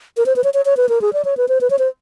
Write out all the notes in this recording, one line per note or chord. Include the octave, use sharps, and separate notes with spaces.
A#4
C5
B4
C#5
C#5
C#5
B4
A#4
G#4
D5
C#5
B4
C5
B4
C#5
C5